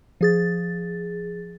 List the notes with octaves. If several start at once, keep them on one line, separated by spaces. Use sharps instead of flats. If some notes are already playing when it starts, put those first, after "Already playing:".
F3 G#4 A6